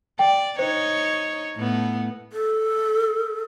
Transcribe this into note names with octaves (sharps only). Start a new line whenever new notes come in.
D5 G5
D#4 C5 C#5
A2 B3
A4